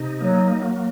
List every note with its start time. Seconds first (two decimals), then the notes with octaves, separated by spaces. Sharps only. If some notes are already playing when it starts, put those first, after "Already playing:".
Already playing: C3 D#4
0.21 F#3 A#3
0.53 F#3